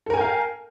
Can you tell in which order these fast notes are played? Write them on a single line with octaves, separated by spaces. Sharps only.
A4 A#4 G#5 G5 F5